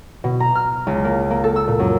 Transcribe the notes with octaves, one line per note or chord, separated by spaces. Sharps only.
B2
A#5
F6
C#2
A#3
A#3
A4
E6
A#2
F#2